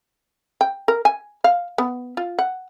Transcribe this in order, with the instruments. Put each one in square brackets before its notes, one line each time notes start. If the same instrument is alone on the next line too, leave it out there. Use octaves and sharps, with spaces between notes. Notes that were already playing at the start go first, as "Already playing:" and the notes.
[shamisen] G5
A#4
G#5
F5
B3
F4
F#5